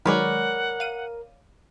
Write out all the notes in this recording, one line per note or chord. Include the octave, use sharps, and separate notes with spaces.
D#3 F#3 G#3 A#4 B4 C#5 D5 F#5
F5 D#7